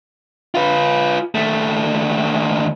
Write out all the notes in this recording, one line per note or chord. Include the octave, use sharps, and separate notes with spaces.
F4 B4
D#2 A3